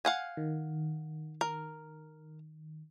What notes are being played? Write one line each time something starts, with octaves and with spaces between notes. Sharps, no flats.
F5 F#5 G#5
D#3
A#4